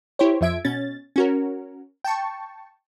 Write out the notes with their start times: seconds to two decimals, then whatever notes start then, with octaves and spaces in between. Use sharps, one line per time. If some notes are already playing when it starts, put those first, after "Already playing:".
0.19 E4 G4 C5 C#5
0.41 F2 F3 E5 G#6 D7
0.65 B2 C#4 A6
1.16 C#4 F#4 A#4
2.04 G5 A5 C#6